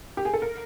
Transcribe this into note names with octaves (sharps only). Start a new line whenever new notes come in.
G4
G#4
A4
A#4